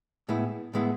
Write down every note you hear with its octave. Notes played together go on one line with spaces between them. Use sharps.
A2 G#3 B3 E4
A2 G#3 B3 E4